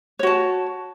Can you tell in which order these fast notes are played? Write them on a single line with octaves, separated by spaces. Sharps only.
C#5 F#4 A5